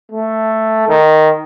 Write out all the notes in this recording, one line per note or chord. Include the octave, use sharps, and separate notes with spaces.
A3
D#3